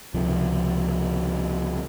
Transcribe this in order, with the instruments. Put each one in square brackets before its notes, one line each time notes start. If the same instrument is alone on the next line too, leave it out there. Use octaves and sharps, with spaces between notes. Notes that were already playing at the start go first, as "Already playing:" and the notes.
[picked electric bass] C#2 C3 F3